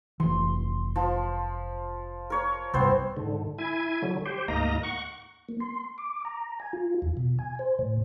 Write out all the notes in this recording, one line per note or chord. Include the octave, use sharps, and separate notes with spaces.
F1 E3 C6
F3
A#4 C#5
C2 G2 B3 C4 C5
G#2 D3
E4 G#5
D3 F#3
G4 C5
D2 G#2 A#3 D#5 A#5
F#5 C#6
A#3
C6
D6
A#5
G#5
F4
E2
B2
G#5
C5
A2